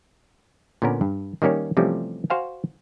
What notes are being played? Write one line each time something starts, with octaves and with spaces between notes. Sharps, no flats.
A#2 D3 B3 C#4 A#4
G2
D#3 G3 A#3 C#4 C#5
C3 E3 F3 G3 A3 C#4
F#4 C5 F5 G#5